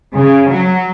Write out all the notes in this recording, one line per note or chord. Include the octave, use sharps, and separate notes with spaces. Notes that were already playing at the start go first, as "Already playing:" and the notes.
C#3
F#3